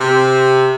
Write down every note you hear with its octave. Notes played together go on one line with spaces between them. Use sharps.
C3